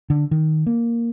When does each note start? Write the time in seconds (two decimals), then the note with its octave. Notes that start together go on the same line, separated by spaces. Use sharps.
0.10 D3
0.31 D#3
0.66 A#3